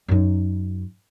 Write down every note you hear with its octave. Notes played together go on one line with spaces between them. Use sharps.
F#2 D#4